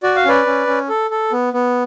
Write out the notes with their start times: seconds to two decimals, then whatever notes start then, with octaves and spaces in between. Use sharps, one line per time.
0.03 F#4 D5
0.16 F5
0.25 C#4 B4 D5
0.46 C#4
0.67 C#4
0.89 A4
1.11 A4
1.32 B3
1.53 B3